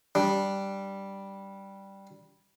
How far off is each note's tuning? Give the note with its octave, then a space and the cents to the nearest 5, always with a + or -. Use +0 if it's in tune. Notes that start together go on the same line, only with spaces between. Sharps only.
G3 +0 D4 +0